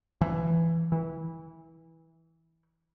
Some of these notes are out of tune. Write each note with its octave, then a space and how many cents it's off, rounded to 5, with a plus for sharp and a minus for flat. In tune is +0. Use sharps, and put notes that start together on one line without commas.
E3 +10
E3 -15